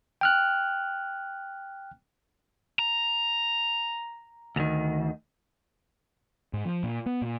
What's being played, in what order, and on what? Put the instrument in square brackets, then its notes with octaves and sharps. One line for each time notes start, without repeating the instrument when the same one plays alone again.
[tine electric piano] G5 F6 F#6
[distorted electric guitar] A#5
[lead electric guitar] D2 D#3
[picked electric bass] G#2
F3
A#2
B3
A#2